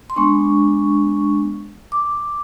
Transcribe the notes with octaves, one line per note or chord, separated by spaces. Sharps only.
C6
G#3 B3 D4 C#6
D6